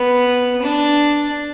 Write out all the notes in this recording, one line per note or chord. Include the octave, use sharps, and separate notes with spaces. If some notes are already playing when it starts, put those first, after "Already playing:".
Already playing: B3
D4